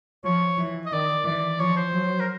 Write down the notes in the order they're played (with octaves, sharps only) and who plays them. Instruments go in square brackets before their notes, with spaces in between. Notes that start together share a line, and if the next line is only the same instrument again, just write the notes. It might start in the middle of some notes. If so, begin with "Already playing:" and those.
[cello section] F3 [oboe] C#5
[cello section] E3
[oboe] D#5
[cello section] D#3 [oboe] D5
[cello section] E3 [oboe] D5
[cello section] F3 [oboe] C#5
[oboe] C5
[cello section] F#3
[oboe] A#4